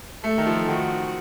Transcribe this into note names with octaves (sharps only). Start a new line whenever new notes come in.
A3 A4
D#3
F3
D#3 F#4